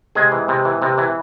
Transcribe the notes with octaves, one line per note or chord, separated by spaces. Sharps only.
C3 G#3 G#4
E3
C3
E3
C3
E3